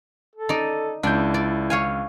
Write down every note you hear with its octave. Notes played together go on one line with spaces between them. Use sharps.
A4
D#4 D5
C#2 D4 E4 G6
D5
C#5 F5 G#5